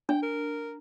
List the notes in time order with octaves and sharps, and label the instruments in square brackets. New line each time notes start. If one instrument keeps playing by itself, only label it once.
[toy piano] D4 [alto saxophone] G5
[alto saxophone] A#4